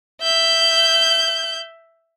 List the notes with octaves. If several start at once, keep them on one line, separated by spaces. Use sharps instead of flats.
E5 G6